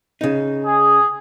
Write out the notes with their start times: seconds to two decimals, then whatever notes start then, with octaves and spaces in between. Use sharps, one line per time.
0.21 C#3 D#4
0.65 G#4